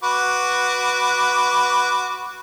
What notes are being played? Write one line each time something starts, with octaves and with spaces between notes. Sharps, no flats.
F#4 B4 D6